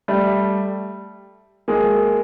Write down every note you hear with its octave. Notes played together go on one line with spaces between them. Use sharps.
G3 A3
G#3 A#3